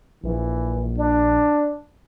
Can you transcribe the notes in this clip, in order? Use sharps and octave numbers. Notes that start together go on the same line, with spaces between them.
A#1 E3
D4